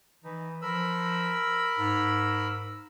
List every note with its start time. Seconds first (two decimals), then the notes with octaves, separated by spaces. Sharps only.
0.24 E3 D#4
0.62 F3 A#4 B5 E6
1.78 G#2